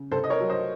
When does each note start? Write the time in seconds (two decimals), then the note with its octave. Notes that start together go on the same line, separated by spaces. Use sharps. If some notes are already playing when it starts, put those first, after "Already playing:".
Already playing: C#3
0.12 C2 A4 C5
0.24 D#5
0.30 A#4 C#5
0.40 F#3
0.50 C5 D#5